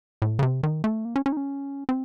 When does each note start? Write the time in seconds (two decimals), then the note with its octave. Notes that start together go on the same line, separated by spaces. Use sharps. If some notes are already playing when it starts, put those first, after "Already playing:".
0.22 A2
0.39 C#3
0.42 C3
0.63 D#3
0.84 A3
1.05 A#3
1.16 C#4
1.26 C#4
1.32 D#4
1.37 C#4
1.89 C4